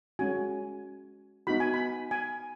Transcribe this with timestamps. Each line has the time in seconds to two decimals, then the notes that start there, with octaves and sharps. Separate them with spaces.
0.19 G#3 C#4 F#4 G#5
1.47 B3 D#4 F#4 B5
1.60 G#5
1.74 B5
2.11 G#5